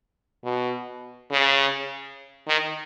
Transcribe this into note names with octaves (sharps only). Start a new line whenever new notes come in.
B2
C#3
D#3